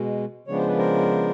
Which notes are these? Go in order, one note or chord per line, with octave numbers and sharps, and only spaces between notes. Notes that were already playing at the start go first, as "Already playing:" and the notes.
Already playing: B2 G#3
C#3 F3 G#3 B3 D4 C#5
C5
B4
A#4 C5